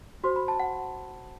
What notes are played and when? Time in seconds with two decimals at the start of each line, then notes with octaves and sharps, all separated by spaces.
0.24 F#4 C5 C6
0.36 B5
0.48 A5
0.60 F#5